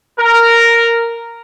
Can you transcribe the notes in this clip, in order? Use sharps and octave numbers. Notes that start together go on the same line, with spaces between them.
A#4